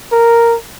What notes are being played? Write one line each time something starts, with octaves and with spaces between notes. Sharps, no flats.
A#4